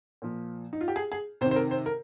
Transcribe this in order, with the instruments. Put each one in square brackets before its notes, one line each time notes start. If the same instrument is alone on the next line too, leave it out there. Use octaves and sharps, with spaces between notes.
[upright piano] A#2 F3
D#4
F4
G4
G#4
G#4
C3 C5
D#3
C5
A#4
C5
A#4